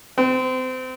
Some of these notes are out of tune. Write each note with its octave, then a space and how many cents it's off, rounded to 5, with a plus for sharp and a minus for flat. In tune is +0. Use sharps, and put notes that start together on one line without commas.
C4 -30